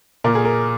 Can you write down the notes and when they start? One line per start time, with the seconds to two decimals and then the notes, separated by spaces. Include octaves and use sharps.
0.24 A#2 A#4
0.35 G#4
0.45 A#4